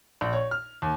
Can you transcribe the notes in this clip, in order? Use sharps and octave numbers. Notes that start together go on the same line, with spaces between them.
A#1
C#5
F6
D#2